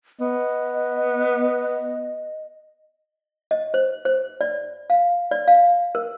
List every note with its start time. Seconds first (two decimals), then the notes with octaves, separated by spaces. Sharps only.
0.20 B3 D#5
3.51 D#5
3.74 C5
4.05 C5
4.41 D5
4.90 F5
5.31 D5
5.48 F5
5.95 A#4